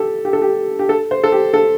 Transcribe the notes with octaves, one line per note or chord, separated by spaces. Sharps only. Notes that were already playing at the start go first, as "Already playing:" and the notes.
Already playing: G4 A4
G4
A4
G4
G4
A4
C5
A4
G4
A4